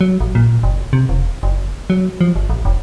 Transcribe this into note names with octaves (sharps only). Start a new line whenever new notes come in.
F#3
A1
A#2
F#1
C3
E1
F#1
F#3
F3
G1
A1
F1